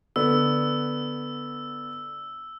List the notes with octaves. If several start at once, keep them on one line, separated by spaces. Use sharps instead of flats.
D3 B3 E6